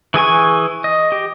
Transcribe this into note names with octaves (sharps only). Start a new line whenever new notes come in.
E3 G#4 G#5 C#6
D#5
G4